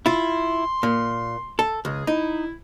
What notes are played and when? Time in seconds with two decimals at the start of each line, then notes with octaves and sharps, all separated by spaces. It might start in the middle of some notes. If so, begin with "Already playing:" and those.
0.06 E4 F4 C6
0.83 A#2
1.59 A4
1.85 C#2 G#4
2.07 D#4 E4